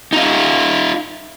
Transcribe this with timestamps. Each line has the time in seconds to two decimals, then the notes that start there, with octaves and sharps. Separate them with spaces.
0.13 D#4 F4